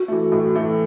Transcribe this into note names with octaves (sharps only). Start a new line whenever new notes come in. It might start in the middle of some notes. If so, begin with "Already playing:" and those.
Already playing: F#4
E3 A3
A2
E3 A3